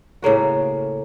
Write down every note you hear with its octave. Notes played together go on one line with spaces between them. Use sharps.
A2 C#3 A#3 F#4